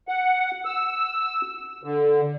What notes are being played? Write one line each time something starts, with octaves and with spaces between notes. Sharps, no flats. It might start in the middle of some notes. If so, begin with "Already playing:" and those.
F#5
E6
D3